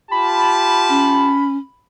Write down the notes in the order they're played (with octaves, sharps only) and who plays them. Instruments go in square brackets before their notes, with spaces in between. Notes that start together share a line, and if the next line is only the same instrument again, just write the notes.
[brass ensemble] F4 G4 A5 [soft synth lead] B5
[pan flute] C#4